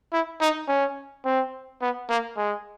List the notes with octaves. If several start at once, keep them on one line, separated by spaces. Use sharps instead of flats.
E4
D#4
C#4
C4
B3
A#3
G#3